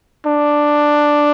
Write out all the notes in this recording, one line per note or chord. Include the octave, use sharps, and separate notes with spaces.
D4